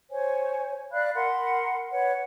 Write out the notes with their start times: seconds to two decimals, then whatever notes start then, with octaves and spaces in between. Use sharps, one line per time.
0.11 C5 C#5 G#5
0.93 D5 F5 B5 F#6
1.14 A#4 F#5 B5 C6
1.90 B4 C#5 F#5